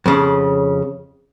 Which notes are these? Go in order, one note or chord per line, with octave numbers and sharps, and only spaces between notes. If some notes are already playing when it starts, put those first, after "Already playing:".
F2 C#3